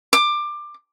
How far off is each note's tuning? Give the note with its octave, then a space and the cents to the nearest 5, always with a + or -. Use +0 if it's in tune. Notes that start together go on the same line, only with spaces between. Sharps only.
D6 +20